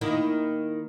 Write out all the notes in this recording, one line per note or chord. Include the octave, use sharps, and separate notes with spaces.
D#3 A#3 E4